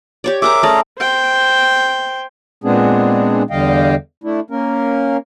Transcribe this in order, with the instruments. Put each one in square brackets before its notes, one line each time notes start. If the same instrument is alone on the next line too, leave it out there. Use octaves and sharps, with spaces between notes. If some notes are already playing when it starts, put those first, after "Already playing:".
[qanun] G4 C#5 D5
[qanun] G#4 A#4 A#5 [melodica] E5 D6
[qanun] A3 D5 [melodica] C#4 G#4 A#5
[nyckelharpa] C5 G5
[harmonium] A#2 G#3 B3 C4 D4 G#4
E2 D3 G3 D#5 F5 G5
A3 D4 E4
A#3 C#4 A#4